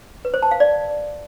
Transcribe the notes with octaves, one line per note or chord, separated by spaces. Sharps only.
B4
C5
A5
F5
D5